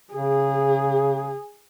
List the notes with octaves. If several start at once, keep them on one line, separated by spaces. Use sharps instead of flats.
C#3 G#4